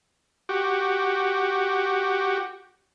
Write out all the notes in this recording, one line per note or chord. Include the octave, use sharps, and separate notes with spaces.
F#4 G4